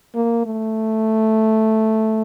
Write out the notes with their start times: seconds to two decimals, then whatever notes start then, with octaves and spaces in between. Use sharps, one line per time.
0.15 A#3
0.46 A3